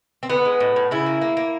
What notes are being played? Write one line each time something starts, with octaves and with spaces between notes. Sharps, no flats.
C4
D3 B3
G#3
A2
A2
C#3 E4
A#3
A#3
A#3